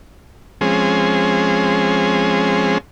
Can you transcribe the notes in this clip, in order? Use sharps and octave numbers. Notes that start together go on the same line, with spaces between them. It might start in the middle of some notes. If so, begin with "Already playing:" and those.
F3 G#3 C4 C#4 G#4